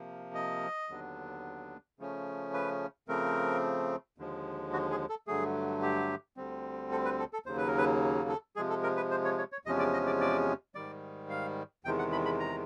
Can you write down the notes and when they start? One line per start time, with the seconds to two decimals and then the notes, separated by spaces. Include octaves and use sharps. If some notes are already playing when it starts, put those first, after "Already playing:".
Already playing: C3 F3 A#3
0.34 D#5
0.89 D#2 D3 F#3 B3 D4
1.99 C#3 F3 A3 C#4
2.53 B4
3.08 C#3 F3 A3 C4 A#4
4.18 D#2 D3 F3 G#3
4.72 F#4
4.91 G#4
5.09 A4
5.27 G2 D3 F#3 A3 G#4
5.82 G4
6.37 D2 D3 G3 C4
6.92 A4
7.05 B4
7.19 A4
7.33 A4
7.46 D#2 C#3 F#3 A#3 C5
7.57 B4
7.68 A#4
7.78 B4
8.29 A4
8.56 C3 F3 G#3 G#4
8.70 A4
8.83 A#4
8.97 B4
9.11 C5
9.25 C#5
9.38 C#5
9.52 C#5
9.65 E2 C3 F3 G#3 C#4 D#5
9.79 D5
9.93 D#5
10.06 D5
10.21 D5
10.75 G#2 D#3 G3 D5
11.30 F5
11.84 E2 C3 D#3 G#3 G5
11.99 F#5
12.12 B5
12.25 B5
12.39 A#5